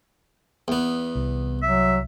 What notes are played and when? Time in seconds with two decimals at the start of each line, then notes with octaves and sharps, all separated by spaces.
0.68 E2 B3
1.15 C2
1.62 F#3 E5